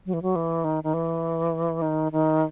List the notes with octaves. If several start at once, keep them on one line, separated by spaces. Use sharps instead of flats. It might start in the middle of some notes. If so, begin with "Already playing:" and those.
F#3
E3
F#3
E3
D#3
D#3
E3
D#3
D#3